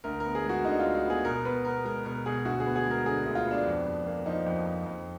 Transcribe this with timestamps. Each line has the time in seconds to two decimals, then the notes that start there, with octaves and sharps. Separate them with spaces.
0.04 D2 A#4
0.20 B3 A#4
0.35 G#4
0.44 G#3 F#4
0.64 D3 D#4
0.79 F4
0.85 D2
0.95 F#4
1.05 B3 G#4
1.24 B2 A#4
1.45 B2 B4
1.65 B3 A#4
1.85 G#3 A#4
2.05 B2 A#4
2.26 B2 G#4
2.45 D2 F#4
2.60 G#4
2.66 B3
2.76 G#4
2.86 G#3 A#4
3.06 D3 G#4
3.26 D2
3.35 F4
3.46 B3
3.51 D4
3.66 F2
3.86 F2
4.06 A#3
4.26 F3 D#4
4.46 F2
4.66 F2
4.86 F2